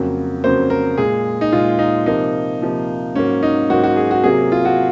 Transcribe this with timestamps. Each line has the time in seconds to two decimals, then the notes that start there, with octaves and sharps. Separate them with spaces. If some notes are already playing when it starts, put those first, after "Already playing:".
Already playing: F2 C#3 F#3 A#3
0.44 F2 C#3 F#3 A#3 C5
0.70 A#4
0.98 A#2 G#3 G#4
1.41 D#4
1.53 A#2 G#3 F4
1.79 D#4
2.06 C3 F3 A#3 D#4
2.61 C3 F3 A#3
3.15 G#2 F#3 A#3 C#4
3.43 D#4
3.69 G#2 F#3 A#3 F#4
3.83 F#4
3.96 G#4
4.11 F#4
4.24 C3 F#3 A#3 G#4
4.52 F4
4.65 F#4